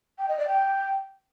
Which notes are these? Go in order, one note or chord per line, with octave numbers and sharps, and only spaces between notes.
G5
D#5
D5
G5